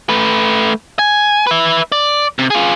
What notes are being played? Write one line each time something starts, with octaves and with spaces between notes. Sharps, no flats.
A3 B4
G#5
B4 E5
D5
C3
F4 G#4